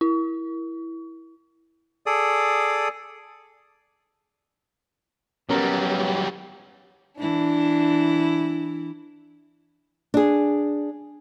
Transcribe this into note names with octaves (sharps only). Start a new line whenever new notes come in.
E4
G#4 A4 D5 D#6
F#3 G3 B3 C#4 A#4
E3 D4 E4
D4 G#4